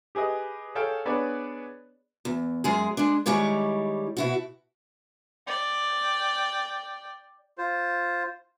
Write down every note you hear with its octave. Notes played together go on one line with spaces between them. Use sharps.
G4 G#4 B4 D#5
G#4 A4 C#5 F5 G5
B3 D4 G#4 B4 C#5 D5
E2
F#2 G#3 G#4
G#3 D4
D#3 G3 G#3 E4 C#5 D5
B2 E4 F#4
D5 G5
F4 C5